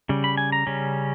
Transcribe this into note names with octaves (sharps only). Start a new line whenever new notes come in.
C#3 G3
B5
G#5
A#5
C#3 G3 C#4